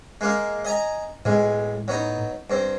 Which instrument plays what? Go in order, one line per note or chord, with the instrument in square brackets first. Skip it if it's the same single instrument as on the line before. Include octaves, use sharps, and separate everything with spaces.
[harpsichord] G#3 A#3 F5
D#5 G#5 A#5
[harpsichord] B1 G#3 [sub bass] A2
[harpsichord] F#3 B3 D#4
G2 C4